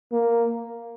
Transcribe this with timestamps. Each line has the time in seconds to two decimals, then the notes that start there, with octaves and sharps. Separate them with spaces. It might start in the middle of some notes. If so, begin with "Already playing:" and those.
0.12 A#3